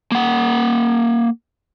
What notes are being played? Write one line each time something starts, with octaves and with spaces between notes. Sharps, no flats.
A#3 F#5